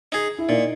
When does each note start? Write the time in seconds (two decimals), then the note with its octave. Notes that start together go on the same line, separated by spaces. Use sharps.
0.12 D#4 G#4
0.38 E4
0.49 A#2 D#4